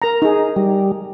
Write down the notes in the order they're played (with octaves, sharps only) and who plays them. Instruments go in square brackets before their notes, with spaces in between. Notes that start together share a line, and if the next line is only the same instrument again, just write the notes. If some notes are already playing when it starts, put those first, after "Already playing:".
[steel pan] A#4 A#5
D#4 G#4
[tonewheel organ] G3